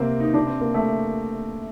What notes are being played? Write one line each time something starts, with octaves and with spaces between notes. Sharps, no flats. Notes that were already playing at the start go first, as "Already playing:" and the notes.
Already playing: C3 A#3 C4
D#4
D4
C4
A#3
A3